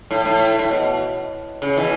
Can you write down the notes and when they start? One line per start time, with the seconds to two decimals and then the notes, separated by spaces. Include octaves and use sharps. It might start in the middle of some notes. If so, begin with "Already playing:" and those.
0.11 A2
0.25 A2
0.59 A2
0.71 B2
1.62 C#3
1.77 B2 E3